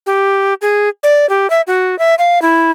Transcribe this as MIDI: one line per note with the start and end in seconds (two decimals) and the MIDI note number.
0.06 0.54 67
0.61 0.89 68
1.03 1.29 74
1.29 1.50 67
1.50 1.61 76
1.67 1.98 66
1.99 2.15 76
2.19 2.42 77
2.42 2.71 64